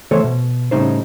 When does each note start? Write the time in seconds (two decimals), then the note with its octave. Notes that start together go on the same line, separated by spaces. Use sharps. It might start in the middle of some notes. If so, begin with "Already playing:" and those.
0.11 E3 A3 A4 C5 C#5
0.24 B2
0.71 A2 C#3 G3 D#4 C5